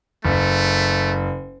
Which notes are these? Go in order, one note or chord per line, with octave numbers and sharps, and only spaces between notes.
F#1 A3